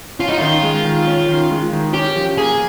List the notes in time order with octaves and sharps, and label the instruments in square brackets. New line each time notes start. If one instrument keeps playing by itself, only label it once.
[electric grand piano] C#4 [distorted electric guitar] F4
[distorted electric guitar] D#4
[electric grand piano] D#3 [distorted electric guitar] F4
[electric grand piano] G#3
D#3
C#4
D#3
G#3
D#3
[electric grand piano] C#4 [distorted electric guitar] G4
[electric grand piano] F3
[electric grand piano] A#3 [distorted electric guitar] G#4